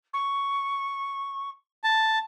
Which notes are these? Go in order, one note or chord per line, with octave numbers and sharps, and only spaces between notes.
C#6
A5